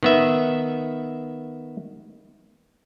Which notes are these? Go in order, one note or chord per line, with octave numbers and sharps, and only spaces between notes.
D#3 B3 E5